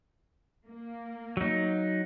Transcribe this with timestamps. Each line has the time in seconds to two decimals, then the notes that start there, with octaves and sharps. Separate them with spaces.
0.67 A#3
1.37 F#3 D#4